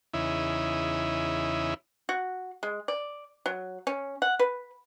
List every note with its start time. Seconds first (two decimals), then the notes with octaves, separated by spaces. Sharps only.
0.14 E2 C#3 D#4 E4
2.09 F#4
2.63 G#3
2.88 D5
3.46 F#3
3.87 C#4
4.22 F#5
4.39 B4